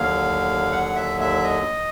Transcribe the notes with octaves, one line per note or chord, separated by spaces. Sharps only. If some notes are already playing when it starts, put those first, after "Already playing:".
Already playing: D#2 D3 F#3 F5
F#5
E5
E5
D#5